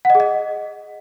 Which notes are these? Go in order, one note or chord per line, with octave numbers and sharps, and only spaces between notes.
F#5
D#5
G#4
D#5